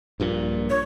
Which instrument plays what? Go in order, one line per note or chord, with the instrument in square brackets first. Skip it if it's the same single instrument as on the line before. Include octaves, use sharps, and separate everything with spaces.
[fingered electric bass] A#1 G2 A#2
[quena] C#5